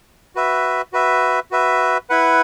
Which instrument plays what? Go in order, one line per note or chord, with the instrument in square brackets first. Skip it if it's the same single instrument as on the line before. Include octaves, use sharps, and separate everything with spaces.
[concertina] F#4 B4 E5
F#4 B4 E5
F#4 B4 E5
E4 B4 F#5